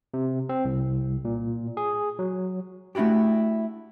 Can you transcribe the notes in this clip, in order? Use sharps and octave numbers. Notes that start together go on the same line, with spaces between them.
C3
C4
C2
A#2
G#4
F#3
A3 D4 E4 F#4 G4